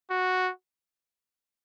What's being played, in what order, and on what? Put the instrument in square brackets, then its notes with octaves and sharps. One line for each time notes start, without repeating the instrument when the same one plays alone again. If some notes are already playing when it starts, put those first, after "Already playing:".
[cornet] F#4